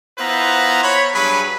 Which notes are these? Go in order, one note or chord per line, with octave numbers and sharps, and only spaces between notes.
B3 E4 F4 B4 C5 A#5
C#5 B5
G2 F#3 G#4 B4 B5